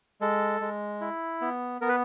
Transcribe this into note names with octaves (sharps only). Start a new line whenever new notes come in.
G#3 A4
G#3
E4
B3
B3 A#4
B4